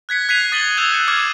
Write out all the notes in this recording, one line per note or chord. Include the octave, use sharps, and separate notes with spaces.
F#6 G#6 B6 C#7
F#6 G#6 B6 C7 D#7 F7
D#6 A6 D#7 F#7 G7
E6 G6 G#6 E7 F7
F#6 C#7
D6 F6 G#6 D#7